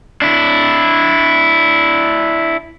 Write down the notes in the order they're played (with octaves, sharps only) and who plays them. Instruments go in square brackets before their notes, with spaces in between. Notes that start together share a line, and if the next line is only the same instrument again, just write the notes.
[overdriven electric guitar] D4 E4